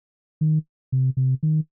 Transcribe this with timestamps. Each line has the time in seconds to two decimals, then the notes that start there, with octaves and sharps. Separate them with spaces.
0.41 D#3
0.92 C3
1.17 C3
1.43 D#3